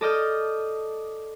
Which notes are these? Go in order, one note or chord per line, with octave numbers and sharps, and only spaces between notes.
A4 D5 D#5 D#6 F6 G6